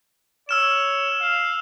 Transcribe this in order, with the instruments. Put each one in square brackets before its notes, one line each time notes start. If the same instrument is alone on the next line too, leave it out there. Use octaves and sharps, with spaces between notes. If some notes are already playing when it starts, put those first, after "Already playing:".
[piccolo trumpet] C#5 [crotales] E6 F6 E7
[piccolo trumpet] F5